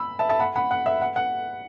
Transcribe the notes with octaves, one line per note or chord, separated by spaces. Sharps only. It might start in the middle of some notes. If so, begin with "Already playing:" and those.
Already playing: B5 E6
E5 A5
E5 A5
F#5 B5
F#5 B5
F#5
E5
F#5
F#5